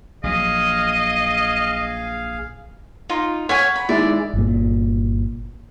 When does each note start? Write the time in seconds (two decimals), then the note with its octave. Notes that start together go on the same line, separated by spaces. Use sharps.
0.23 A#1 F#3 G#4 D#5 F5
3.09 D#4 F4
3.49 C#5 F5 F#5 G#5 C#6 B6
3.76 B5
3.89 D#3 G#3 E4 D5
4.33 G1 A#2